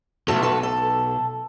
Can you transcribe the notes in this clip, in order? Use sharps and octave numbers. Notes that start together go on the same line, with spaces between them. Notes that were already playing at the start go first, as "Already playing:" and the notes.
B1 F2 A3 F#4 A4
F#4 A4 B4
A4